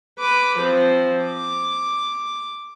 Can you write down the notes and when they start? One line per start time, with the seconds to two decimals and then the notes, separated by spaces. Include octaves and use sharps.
0.19 B4 D6
0.59 F3 C4
1.24 D6